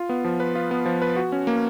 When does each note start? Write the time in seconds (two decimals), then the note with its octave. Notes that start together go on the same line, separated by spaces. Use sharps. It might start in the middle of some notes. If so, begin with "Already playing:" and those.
Already playing: F4
0.09 B3
0.24 F3
0.40 B4
0.55 F4
0.71 B3
0.86 F3
1.02 B4
1.16 F#4
1.32 C#4
1.47 A#3